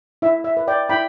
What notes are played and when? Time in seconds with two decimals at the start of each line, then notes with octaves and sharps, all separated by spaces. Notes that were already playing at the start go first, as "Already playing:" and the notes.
0.22 E4 E5
0.44 E5
0.57 B4
0.68 D5 G5
0.89 E4 G5 B5